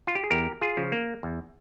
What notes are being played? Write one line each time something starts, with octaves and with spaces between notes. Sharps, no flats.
F4
G4
G#4
E2 G4 A#4
F4 G#4
C#3 F3
A#3
E2